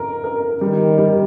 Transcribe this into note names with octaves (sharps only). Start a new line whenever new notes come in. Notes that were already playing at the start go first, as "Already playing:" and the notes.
Already playing: A#4
A#4
D#3 G3
G3